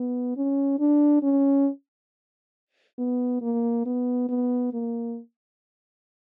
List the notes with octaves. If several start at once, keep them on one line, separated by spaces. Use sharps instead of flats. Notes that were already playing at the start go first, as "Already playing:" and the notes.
Already playing: B3
C#4
D4
C#4
B3
A#3
B3
B3
A#3